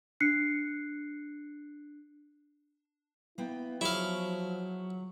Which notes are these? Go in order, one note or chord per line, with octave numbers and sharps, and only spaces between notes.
D4 F#6 C7 C#7
A#3 B3 E4 G5
F3 F#3 E4 G#4 F5